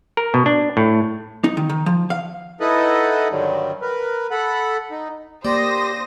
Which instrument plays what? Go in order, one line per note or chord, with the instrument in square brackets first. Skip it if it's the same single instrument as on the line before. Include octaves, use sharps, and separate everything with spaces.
[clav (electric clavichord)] A#4
B2
D4
A2
[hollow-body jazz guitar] D#4
D#3
D#3
F3
F5
[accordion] D#4 E4 A4 B4 D#5 F#5
G2 D3 D#3 F#3 G3
A#4 B4
A4 F#5 B5
D#4
[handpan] A#3 [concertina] G4 [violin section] C5 D#6 A#6 [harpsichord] D5